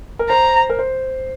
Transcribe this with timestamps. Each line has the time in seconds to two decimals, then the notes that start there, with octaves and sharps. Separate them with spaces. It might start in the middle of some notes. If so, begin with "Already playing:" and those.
0.19 A#4
0.29 C5 A#5
0.70 A#4
0.79 C5